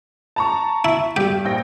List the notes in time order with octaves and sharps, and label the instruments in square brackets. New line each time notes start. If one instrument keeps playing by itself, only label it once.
[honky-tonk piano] A5 A#5 C#6
[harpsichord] E4
[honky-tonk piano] G2 [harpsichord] G4
[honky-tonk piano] A#1 G5 A#6